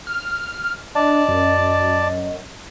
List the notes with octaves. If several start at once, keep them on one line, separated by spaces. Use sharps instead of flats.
F6
D4 D5 D#5 A5
F#2